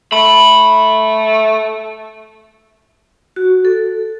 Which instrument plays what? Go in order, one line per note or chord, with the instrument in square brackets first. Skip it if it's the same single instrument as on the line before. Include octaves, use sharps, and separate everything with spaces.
[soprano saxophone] A3 [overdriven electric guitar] B5
[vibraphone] F#4
A4